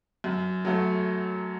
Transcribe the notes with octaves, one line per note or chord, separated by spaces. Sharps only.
F#2
F#3 A3